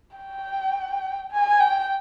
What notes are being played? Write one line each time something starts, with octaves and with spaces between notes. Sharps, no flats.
G5
G#5
G5